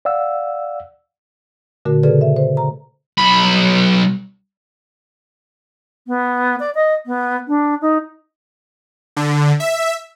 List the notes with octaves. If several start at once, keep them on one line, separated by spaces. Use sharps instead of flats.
D5 F5 F#5 E6
A#2 D3 A3 F#4 A#4
C#3 G#4 A4 B4 D5
E5
C5
A#5
B1 B5
B3
D5
D#5
B3
D4
D#4
D3
E5